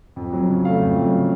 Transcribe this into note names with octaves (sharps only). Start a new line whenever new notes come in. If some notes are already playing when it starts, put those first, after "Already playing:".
F2
F#3
C#3
A3 F5
F2
F#3
C#3